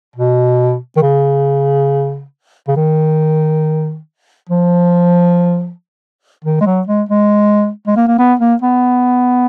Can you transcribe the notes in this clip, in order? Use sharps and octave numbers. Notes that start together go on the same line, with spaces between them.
B2
D#3
C#3
C#3
D#3
F3
D#3
G#3
F#3
G#3
G#3
G#3
A#3
A#3
B3
A#3
B3